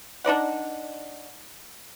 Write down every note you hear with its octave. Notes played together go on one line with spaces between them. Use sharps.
D4 D#4 D5 F#5